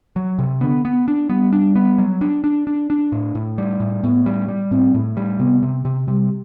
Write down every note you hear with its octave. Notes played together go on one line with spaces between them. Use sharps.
F#3
C3
D3 B3
B3
D4
G3 B3
D4
B3
F#3
D4
D4
D4
D4
A2
A2
G3
A2
A2 B3
G3
G3
A2 C4
A2
G3
C3 B3
C3
C3
C3 G3